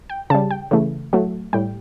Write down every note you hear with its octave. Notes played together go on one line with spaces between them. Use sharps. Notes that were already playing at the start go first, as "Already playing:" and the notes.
G5
C#3 G3 A5
G5
C#3 E3 A3
A2 F#3 A3
A2 G3 G5